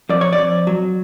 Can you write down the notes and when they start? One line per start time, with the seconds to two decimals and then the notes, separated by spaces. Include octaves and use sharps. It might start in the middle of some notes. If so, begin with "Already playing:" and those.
0.09 F2 D5
0.21 C#5
0.33 D5
0.38 F2
0.67 F#3